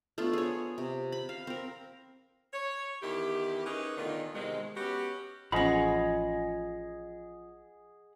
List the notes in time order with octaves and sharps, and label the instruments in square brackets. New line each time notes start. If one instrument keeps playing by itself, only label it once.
[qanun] A3 B3 D4 F4
G#4 C#5
C3
B5
F5
C4 A#4
[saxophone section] C#5
E2 D#3 E4 G4
C#4 D#4 G4 G#4 A#4 B4
E2 A#2 D3 D#3 A3 F4
E2 C3 D#3 G#3
B3 C#4 F#4 G4
[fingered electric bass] A1 [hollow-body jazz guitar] F3 C#4 [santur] G#4 [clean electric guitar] D#5 F#5 B5